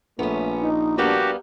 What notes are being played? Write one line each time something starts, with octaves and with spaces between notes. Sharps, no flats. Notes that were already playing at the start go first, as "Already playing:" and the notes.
A#1 A3 B3 C#4
D#4
G3 A#3 B3 D4 F#4 G4